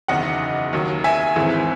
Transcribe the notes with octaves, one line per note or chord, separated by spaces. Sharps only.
F#1 E2 D#3 D#5 F#5
D#2 D#3 F#3
E5 G#5
G#1 G#2 E3